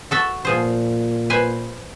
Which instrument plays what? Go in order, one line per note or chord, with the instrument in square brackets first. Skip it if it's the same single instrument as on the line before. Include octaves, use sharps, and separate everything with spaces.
[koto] F#4 A4 E5
[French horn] A#2 [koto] F3 G#4 C5
[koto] B4 C5 G#5